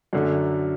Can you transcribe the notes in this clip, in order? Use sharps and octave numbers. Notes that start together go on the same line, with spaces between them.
F#2 D3 F#3 A3